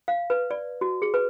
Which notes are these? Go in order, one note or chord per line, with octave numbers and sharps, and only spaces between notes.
F5
B4
D5
F#4
G#4
B4